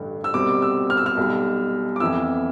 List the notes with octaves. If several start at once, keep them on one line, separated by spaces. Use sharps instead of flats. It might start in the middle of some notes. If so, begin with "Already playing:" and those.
Already playing: A1 G2 D3
E6
C2 B2 G3 C4 D6
E6
F6
E6
F6
B1 B2 G3
D6
F2 E3 B3 E4 E6